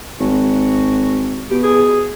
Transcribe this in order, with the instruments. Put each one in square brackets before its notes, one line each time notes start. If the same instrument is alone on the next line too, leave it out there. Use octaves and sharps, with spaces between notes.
[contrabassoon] G#1 [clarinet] F#4
[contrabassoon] B2 [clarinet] G4
[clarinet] G#4